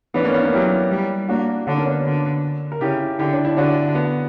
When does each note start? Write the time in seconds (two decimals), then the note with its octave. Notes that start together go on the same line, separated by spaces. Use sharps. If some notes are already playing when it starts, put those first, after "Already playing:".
0.14 E3 B3 D4
0.24 A#3 C#4
0.34 B3
0.43 A#3 C#4
0.53 F#3 E4 G4
0.91 G3
1.28 A#3 D4 F#4
1.66 D3 D4 F#4
1.77 A#3 C#4
1.85 B3 D4
2.05 D3
2.72 A#4
2.81 C#3 E4 G4
3.19 D3 E4 G4
3.33 D4
3.45 E4
3.57 D3 D4 F#4
3.95 B3